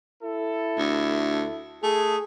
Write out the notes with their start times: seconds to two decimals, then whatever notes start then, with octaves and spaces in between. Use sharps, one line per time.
0.24 E4 A4
0.78 D2
1.83 A3 G#4